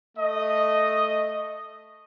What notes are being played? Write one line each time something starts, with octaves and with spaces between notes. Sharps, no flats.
A3 D#5